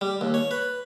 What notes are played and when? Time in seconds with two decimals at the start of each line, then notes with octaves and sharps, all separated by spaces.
0.01 G3
0.21 D#2
0.34 C#5
0.51 B4